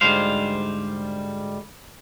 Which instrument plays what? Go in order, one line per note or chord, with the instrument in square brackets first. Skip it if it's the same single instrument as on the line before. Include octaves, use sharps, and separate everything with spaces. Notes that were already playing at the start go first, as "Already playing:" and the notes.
[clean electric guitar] D2 G#2 G3 C5 F5